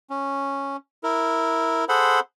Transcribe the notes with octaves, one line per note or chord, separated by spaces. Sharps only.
C#4
E4 A#4
G#4 A4 C5 F#5 B5 C6